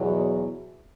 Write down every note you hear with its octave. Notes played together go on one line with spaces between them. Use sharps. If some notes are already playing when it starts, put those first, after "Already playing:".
Already playing: E2 B2 F#3